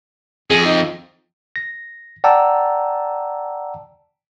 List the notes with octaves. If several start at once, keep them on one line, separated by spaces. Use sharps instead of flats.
F2 G#4
D#4
A#6
D5 F#5 G5 A5 A#5 E6